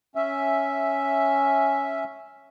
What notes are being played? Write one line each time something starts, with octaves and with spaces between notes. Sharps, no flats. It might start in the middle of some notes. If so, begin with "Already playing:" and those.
C#4 E5